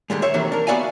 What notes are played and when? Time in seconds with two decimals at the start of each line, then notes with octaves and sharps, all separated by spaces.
0.10 D3 D#3 G3 G#3
0.22 C5 C#5 E5
0.34 C3 D#3 E3 F#3 A3 C4
0.52 D4 A#4
0.67 B3 F#4 D5 E5 F5 G#5